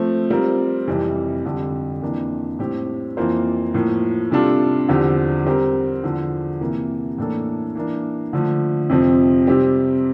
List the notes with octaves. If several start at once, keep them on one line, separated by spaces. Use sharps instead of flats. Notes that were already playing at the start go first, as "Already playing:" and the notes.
Already playing: F3 A3 C4
G3 C4 F4 A#4
F2 C3 E3 G3
F2 D3 G3
F2 E3 A#3 D4
A2 G3 C4 G4
F2 E3 A#3 F4 C5
A2 F3 A#3
C3 G3 D4 F4 A4
E2 D3 F3 C4 G4
G3 C4 G4 A#4
E2 D3 F3
C3 E3 A#3
A2 E3 A#3 D4 A4
E3 A#3 D4
D3 F3 A3
F2 C3 F3 C4
C3 G3 C4 G4